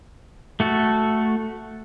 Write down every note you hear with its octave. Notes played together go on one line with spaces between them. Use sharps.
A3 F#4 A4